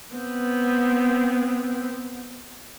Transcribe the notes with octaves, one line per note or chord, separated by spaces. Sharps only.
B3 C4